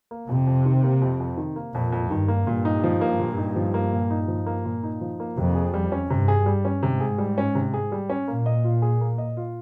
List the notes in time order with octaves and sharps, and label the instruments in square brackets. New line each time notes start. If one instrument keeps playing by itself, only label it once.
[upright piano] A#3
[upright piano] F2 [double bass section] C3
[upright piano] F2
D#3
A#3
F2
F2
D#3
A#3
[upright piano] F2 [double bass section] A#2
[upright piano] F2
[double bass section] G2 [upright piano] D#3
[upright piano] A#3
[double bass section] G2 [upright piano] A#2
[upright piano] D#4
F3
A#3
A#2
D#4
F3
A#3
A#2
D#4
F3
A#3
A#2
D#4
F3
A#3
[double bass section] F2 [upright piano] C3
[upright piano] G#4
G3
C#4
[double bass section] G2 [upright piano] C3
[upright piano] G#4
G3
C#4
[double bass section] G#2 [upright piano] C3
[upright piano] G#4
G3
C#4
C3
G#4
G3
C#4
[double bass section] A#2 [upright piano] A#3
[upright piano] D#5
F4
G#4
A#3
D#5
F4